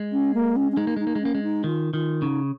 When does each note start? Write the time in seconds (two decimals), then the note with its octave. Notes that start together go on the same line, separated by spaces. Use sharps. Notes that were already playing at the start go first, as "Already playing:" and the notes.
Already playing: G#3
0.12 C#4
0.34 A#3
0.56 C#4
0.72 C#4
0.77 G#3 D#4
0.87 A#3
0.97 G#3 D#4
1.07 A#3
1.15 G#3
1.21 A#3 C#4
1.35 G#3
1.43 D#4
1.64 D#3 F4
1.93 D#3 F4
2.22 C#3 D#4